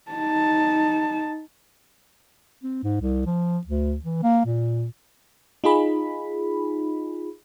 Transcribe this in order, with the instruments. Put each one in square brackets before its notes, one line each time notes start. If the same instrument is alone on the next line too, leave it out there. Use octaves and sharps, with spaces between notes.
[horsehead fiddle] D#4 A5
[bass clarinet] C4
G#2
C2
F3
D2
E3
A#3
A#2
[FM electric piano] D#4 F4 G#4 B5